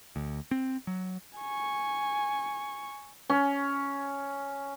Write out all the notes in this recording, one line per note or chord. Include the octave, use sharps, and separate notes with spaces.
D2
C4
F#3
G#5 C#6
C#4